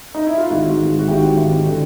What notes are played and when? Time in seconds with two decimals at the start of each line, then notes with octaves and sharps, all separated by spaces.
0.15 D#4
0.26 E4
0.38 F4
0.50 G#1 G#2 E3 F#4
0.79 G#1 G#2 E3
0.99 F#4
1.08 G#1 G#2 E3 G4
1.37 G#1 G#2 E3
1.66 D3